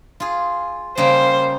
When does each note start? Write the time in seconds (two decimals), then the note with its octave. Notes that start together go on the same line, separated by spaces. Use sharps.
0.20 F4 G#4
0.98 C#3 G3 A#3 C5